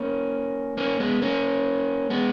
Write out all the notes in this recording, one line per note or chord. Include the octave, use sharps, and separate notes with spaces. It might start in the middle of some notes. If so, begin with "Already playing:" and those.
Already playing: A#3 C#4
A#3 C#4
G#3 B3
A#3 C#4
G#3 B3